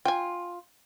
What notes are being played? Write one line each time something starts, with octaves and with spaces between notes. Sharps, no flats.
F4 G5 G#5